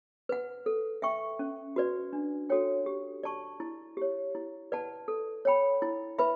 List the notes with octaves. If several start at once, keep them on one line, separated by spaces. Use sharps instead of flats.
B4 F#5
A4
E5 G5 C#6
C#4
F#4 B4 D5
D4
F#4 A4 C#5 G5
G4
D5 A5 C#6
E4
G4 C#5
E4
B4 D5 F#5 A5
A4
C#5 G5 B5
E4
B4 E5 B5